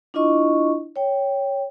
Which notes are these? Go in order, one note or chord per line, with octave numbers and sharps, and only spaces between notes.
D4 E4 F4 D#5 C#6
C#5 G5